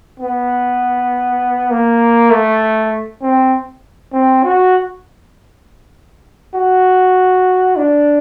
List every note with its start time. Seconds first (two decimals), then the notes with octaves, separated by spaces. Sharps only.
0.20 B3
1.70 A#3
2.31 A3
3.22 C4
4.13 C4
4.43 F#4
6.55 F#4
7.76 D4